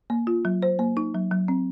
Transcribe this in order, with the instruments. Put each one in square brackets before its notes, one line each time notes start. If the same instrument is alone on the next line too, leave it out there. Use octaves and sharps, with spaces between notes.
[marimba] A#3
F4
F#3
C5
A#3
D#4
F#3
F#3
C4